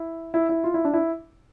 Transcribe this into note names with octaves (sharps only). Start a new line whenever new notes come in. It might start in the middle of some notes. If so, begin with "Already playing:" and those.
Already playing: E4
E4
E4
F4
E4
D4
E4